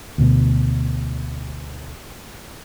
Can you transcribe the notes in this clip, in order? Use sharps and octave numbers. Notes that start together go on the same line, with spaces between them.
D2 B2